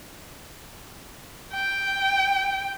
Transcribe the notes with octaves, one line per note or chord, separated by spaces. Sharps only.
G5